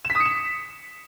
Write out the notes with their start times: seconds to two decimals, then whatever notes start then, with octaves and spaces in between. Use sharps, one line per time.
0.05 E7
0.10 B6
0.15 D#6
0.20 C#7
0.25 E7